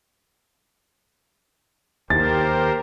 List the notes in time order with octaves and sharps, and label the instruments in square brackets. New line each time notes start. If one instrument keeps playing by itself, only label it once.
[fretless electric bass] D#2 [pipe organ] G4 A#4 C5 [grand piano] A6